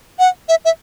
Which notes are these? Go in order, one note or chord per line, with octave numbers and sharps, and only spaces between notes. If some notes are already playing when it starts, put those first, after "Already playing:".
F#5
E5
E5